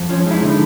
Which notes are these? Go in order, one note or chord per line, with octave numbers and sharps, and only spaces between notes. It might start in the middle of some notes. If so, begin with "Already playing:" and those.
Already playing: F2
F3 C#4
G#3 D#4 E4
D3 D#4